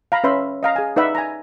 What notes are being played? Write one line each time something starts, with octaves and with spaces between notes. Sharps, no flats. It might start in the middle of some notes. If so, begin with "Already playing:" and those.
F5 A#5 B5
C#4 B4 E5 B5 C6
D#5 F5 A#5
G#4 G#5
D#4 B4 D5 E5 F#5 B5
G#5 A#5